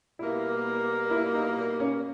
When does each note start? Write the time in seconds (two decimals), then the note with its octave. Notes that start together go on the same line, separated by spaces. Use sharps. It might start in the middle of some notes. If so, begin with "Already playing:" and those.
0.19 B2 G3 A#3 E4
1.11 E4
1.34 D#4
1.80 C#4